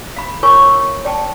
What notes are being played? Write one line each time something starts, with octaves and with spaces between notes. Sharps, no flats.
F5 B5
F4 A#4 C#5 G#5 C#6
D5 G5 A5